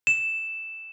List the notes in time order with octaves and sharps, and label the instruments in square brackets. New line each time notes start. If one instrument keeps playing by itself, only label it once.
[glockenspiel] E7